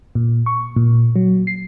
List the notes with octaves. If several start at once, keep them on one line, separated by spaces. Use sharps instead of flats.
A#2
C#6
A#2
F#3
C7